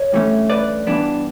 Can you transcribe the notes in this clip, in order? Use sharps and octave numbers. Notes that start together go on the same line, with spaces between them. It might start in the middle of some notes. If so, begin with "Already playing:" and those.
Already playing: C#5
G2 E3 A3 C#4
B4 D5
G2 E3 B3 D4